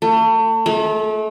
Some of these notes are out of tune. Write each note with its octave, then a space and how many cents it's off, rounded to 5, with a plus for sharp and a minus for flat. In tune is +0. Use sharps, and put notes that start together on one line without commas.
A3 +35
A3 -35